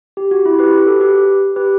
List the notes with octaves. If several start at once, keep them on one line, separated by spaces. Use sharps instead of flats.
G4
F#4
E4
G4 B4
G4 B4
F#4 A4
G4 B4
G4 B4